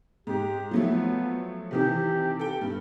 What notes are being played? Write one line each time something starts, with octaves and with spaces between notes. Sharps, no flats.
G#2 G4
F3 F#3 A3 B3
C3 D#3 E3 G4
A4 G5
G2